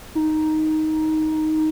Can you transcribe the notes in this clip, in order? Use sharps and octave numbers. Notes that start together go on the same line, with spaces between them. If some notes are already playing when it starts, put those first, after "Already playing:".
D#4